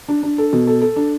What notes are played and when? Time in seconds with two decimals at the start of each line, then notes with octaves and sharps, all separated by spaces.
0.08 D4
0.23 D4
0.38 A4
0.53 B2
0.67 A4
0.82 A4
0.96 D4